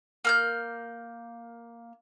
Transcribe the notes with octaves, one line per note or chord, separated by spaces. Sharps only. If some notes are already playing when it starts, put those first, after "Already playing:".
A#3 F6 G6